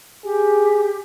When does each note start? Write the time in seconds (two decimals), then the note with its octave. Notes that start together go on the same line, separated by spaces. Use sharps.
0.24 G4 G#4